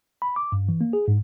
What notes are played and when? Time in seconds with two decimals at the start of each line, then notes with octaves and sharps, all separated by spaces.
0.22 B5
0.36 D6
0.52 G2
0.69 E3
0.81 A#3
0.93 G#4
1.08 G#2